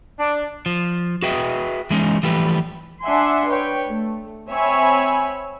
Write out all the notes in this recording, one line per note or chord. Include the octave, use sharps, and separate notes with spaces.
D4
F3
F#4 G#4 B4 D#5 E5 G5
E3 G#3 C#4 D#4
E3 F3 G3 A3 G4 B4
D4 E5 F#5 G#5 C6
B4 C#5 G5
A3
C4 C#5 E5 G#5 B5